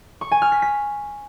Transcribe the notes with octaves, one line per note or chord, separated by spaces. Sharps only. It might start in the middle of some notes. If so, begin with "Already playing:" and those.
C#6
G#5
F6
B6
B6